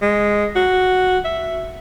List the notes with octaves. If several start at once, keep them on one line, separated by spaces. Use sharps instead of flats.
G#3
F#4
E5